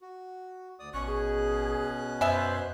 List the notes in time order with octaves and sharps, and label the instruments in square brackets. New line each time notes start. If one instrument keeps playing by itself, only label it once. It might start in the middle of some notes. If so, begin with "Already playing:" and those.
[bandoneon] F#4
D2 D5 D#6
[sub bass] A1 [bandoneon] B2 C#4 F#6 [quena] C#6
[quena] G#4
[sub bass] F#2 [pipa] B3 E5 G#5 [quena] C5